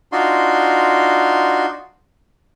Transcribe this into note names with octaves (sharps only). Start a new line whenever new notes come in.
D4 D#4 F4 F#4 C6